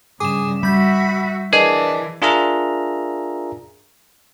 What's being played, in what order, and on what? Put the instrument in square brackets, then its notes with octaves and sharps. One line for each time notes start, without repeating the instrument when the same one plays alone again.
[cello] G2 C#3 [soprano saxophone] G#4 [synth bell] D6 E7
[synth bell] G3 G6 [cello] F#4 E5 [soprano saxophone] B5
[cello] E3 [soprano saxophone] D4 [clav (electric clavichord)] G#4 [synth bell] A#4 B4 D#5
[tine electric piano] D4 F4 G#4 A#4 E5 A#5